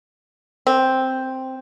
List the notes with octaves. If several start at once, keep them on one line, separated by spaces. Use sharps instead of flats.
C4